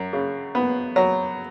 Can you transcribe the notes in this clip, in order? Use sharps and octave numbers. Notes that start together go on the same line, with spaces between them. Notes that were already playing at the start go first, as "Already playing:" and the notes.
Already playing: F#2
C#3
B3
F#3